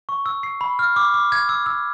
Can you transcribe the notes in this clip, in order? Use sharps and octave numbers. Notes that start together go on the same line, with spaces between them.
C#6
E6
C7
B5
F6
D6
D6
G#6
E6
E6